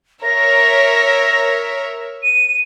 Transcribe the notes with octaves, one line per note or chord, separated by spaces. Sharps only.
A#4 C#5 E5 A#6
D#7